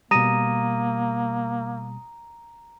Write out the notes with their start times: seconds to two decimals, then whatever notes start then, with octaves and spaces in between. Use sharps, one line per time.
0.11 B2 G3 A#3 A#5 D#6 A#6 D#7